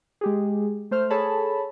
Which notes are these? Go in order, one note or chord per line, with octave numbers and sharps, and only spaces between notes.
G#3 G4 G#4
A3 C5 F6
G#4 A4 C#5 A5 B5